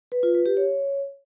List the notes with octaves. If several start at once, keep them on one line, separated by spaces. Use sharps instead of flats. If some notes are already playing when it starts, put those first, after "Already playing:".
B4
F4
B4
G4
C#5